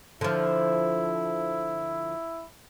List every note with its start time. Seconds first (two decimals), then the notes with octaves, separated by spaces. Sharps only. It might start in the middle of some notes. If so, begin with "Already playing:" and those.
0.21 D3 F3 E4